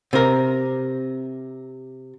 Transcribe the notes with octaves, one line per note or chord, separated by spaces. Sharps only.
C3 A#4